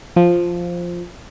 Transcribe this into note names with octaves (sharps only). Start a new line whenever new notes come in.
F3